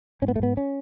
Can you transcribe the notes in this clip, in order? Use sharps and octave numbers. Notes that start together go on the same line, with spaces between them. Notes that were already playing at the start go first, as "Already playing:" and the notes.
G#2 C#4
B3
A3
G#2 B3
C#4